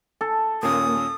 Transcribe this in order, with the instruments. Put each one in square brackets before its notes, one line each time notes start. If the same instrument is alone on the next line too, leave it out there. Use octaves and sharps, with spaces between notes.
[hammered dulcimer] A4
[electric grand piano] D#2 A#2 C#4 [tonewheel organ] A#3 [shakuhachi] D#6